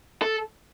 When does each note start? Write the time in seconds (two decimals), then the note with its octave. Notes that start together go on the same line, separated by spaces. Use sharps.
0.22 A4